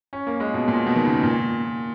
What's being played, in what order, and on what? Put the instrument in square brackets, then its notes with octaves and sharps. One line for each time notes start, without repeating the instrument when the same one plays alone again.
[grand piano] C#4
A#3
G#3
B2
A#2
B2
D#3
C#3
A#2